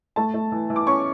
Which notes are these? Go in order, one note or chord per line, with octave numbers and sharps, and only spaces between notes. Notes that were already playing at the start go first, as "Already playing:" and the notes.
A3 A5
A3
E3
E3
D6
C#4 C#6